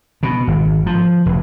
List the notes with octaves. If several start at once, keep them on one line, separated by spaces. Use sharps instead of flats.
B2
G#1
F3
F1